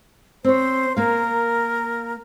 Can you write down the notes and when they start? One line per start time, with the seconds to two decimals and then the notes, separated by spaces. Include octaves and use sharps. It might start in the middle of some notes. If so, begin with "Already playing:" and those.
0.44 C4 C5 C#5
0.97 A#3 A#4 F5